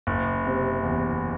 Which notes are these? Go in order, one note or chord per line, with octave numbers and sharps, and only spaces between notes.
F#1
C3
E2